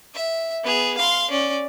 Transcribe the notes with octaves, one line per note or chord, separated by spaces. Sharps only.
E5
B3 G#4
F5 C6
C#4 D5